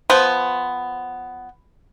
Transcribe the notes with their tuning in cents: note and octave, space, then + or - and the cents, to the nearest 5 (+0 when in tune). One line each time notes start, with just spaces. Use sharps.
F3 +0 B3 +10 C5 +0